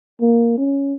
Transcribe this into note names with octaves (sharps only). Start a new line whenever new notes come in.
A#3
C#4